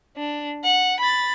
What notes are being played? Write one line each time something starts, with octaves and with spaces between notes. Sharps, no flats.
D4
F#5
B5 A6